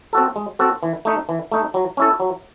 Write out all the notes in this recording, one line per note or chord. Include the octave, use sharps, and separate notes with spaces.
C4 F#4 A4
G#3
C4 F#4 A4
E3
A3 D#4
E3
A3 D#4
F#3
C#4 E4 A4
F#3